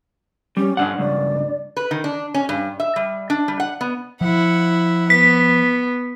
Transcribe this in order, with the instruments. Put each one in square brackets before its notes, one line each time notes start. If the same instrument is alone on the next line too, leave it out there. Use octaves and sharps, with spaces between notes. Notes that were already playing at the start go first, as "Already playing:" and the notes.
[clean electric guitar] G3 [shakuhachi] C#4
[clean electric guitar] G2 B2 F#5 [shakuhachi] D4
[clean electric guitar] C#2 G2 [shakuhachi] D5
[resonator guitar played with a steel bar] B4
D#3
D4
C#4
G2
E5
G3
D4
G3
F#5
B3
[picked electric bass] F3 [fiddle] E4 F#5
[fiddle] B3 [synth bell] B6